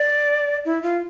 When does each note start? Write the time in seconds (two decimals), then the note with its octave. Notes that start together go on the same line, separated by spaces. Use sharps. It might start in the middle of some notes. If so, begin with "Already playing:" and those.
Already playing: D5
0.65 E4
0.83 F4